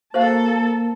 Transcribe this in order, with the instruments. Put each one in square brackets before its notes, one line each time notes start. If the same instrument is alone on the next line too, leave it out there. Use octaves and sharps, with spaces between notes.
[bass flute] A#3 [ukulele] F#4 B4 F5 [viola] A4 A5 [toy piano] C5